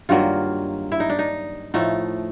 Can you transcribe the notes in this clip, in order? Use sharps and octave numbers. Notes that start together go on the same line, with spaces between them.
G2 D#3 F#3 A#3 F4
E4
D#4
D4
D#4
A2 F3 A3 D#4